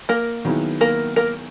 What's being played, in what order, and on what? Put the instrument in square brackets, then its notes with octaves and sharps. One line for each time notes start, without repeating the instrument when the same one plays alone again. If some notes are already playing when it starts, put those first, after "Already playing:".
[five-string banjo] A#3 A#4
[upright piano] D#3 F#3 B3 E4 G#4
[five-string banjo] A#3 A#4
A#3 A#4